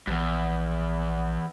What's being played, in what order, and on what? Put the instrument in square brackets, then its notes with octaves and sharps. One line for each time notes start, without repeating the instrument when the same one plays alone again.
[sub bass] A#1 [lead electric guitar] E2 G2